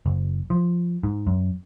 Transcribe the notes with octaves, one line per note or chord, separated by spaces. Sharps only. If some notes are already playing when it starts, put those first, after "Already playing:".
F#1
F3
G#2
F#2